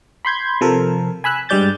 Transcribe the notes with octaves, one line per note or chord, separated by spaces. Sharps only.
B5 C6 G6 G#6
C3 F3 A4 A#4
G#5 B5 E6 F#6
G2 G3 G#3 D5 G6 A6